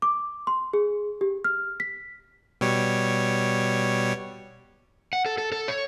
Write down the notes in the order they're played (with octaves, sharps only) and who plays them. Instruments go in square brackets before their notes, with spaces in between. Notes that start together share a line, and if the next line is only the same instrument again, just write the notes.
[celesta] D6
C6
G#4
G4
F6
B6
[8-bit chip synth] B2 G3 C#5
[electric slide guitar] F#5
A4
A4
A4
C#5